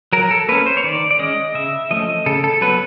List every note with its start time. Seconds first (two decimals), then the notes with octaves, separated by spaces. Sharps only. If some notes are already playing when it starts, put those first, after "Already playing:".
0.13 F#3 A#4
0.31 A4
0.48 A#3 C#4 B4
0.66 C5
0.77 C#5
0.84 D#3 D5
1.11 D5
1.19 G#3 C#4 D#5
1.54 C#3 E5
1.91 F3 A3 C#4 D#5
2.26 C#3 A4
2.44 A4
2.61 F#3 B3 B4